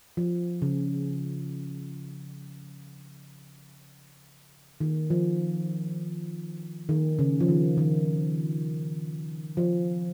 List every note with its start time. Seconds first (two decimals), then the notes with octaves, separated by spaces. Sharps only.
0.17 F3
0.62 C#3
4.81 D#3
5.10 F3
6.89 D#3
7.19 C#3
7.40 F3
7.48 D#3
7.78 D#3
9.57 F3